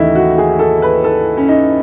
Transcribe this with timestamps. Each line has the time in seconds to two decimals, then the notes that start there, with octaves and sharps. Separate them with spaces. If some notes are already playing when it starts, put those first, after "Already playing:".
Already playing: D#2 C#3 E3 A3 D#4 E4
0.15 F#4
0.38 G#4
0.59 A4
0.82 B4
1.04 A4
1.37 C#4
1.48 D#4